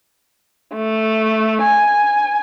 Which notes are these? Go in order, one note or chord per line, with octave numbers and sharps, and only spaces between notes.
A3
G#5